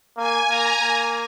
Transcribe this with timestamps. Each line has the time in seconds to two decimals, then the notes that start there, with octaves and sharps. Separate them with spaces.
0.17 A#3 G#5
0.48 A#3 A#5
0.81 A#3 G#5